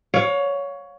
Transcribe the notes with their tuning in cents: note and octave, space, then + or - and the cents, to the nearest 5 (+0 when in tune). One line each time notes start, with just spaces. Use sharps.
C#5 +15 F5 +40